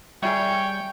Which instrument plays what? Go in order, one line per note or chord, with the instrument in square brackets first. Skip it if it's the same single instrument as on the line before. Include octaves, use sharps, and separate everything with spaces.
[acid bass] G3 [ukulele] G#4 E5 [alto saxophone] C#5 [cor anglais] G5